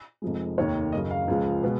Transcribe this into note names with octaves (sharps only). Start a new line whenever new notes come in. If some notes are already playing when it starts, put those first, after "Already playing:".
F1 F2 F3 G#3
F1 D#2 D#3 A#3 C#5
F#1 F#2 C#3 D#5
F5
C#2 C#3 F3 G#3
B2 G#3 B3